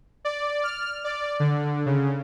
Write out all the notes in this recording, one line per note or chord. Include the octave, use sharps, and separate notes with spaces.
D5
F6
D5
D3
C#3